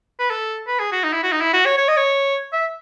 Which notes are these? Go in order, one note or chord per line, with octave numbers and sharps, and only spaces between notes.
B4
A4
B4
G#4
F#4
D#4
E4
F#4
D#4
E4
F#4
C#5
C#5
D#5
C#5
E5